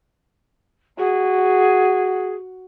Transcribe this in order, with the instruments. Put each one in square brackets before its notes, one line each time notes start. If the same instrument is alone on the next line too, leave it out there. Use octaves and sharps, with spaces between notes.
[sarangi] F#4 [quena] G#4